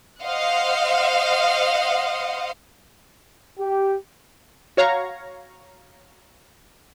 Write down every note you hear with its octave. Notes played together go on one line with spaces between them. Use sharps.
C5 D#5 F5 F#5
G4
F#4 C#5 F5 A#5 C#6